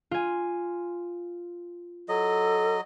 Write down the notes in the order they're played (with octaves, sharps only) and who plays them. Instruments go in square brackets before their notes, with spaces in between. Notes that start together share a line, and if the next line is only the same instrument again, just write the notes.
[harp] F4 G#5
[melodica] F#3 D#5 [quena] A4